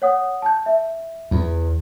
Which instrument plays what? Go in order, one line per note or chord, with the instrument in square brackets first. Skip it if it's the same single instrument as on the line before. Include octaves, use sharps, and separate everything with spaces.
[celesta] C#5 F#5 D#6
A5 G6
E5
[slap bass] E2